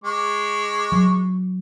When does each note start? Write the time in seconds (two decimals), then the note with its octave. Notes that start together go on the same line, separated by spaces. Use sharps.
0.04 G#3 C#6 D6
0.92 F#3